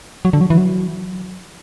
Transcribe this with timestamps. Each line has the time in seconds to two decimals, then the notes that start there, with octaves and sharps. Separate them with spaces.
0.25 F#3
0.33 D3
0.41 F#3
0.50 E3
0.58 F#3